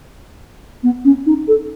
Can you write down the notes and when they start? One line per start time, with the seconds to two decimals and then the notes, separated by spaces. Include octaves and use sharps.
0.83 B3
1.04 C#4
1.26 D#4
1.48 A4